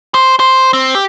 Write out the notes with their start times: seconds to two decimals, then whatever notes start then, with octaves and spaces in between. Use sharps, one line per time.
0.14 C5
0.40 C5
0.73 C4
0.95 G4